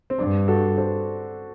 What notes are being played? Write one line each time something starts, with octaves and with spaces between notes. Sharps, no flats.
C4
G2 D4
F#4 A4
A4 C5